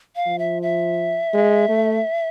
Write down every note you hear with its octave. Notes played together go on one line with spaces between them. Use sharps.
F5
F3
E5
E5
G#3
A3